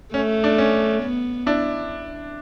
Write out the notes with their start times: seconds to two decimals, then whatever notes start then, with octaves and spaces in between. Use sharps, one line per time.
0.14 A3 C#4
0.44 D4
0.58 C#4
1.03 B3
1.46 D4 E4